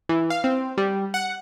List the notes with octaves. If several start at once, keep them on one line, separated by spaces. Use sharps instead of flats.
E3
F5
C4
G3
F#5